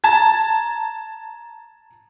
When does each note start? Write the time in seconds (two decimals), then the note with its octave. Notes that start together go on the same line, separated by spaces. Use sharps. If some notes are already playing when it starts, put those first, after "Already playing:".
0.04 A5 A#5 G#6